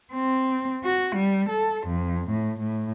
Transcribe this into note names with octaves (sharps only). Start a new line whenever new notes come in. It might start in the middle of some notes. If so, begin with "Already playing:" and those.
C4
F#4
G3
A4
F2
A2
A2